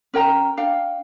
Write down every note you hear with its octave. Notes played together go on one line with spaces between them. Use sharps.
C#4 A#4 G5 A#5
D4 F5 G5